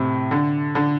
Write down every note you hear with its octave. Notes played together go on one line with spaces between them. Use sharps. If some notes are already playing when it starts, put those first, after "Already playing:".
Already playing: A2 C3
D3
D3